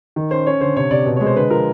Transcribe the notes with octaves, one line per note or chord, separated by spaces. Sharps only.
D#3
C#4 C5
C#4 C#5
D3 C5
C3 C#5
C3 D5
B2
C#5
G#3
C5
D3 B4
F3 A#4